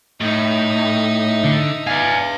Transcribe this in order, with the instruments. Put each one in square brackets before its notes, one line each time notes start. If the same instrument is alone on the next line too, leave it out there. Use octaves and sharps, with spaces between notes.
[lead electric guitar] A2 [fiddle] D#4 E5
[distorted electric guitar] D3
[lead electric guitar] B4 F5 [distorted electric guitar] D5 G#5